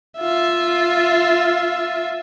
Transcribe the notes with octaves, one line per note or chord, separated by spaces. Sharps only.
F4 E5